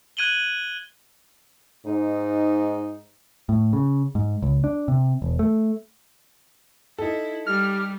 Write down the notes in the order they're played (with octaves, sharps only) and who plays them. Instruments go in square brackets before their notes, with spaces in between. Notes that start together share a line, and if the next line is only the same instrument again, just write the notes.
[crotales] F#6 G#6 D#7 F#7 G7
[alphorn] G#2 [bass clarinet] D#4
[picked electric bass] A2
C#3
G#2
C#2
D4
C3
E1
A3
[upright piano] D#4 A4 [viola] E4
[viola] G3 [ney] G4 [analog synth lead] F6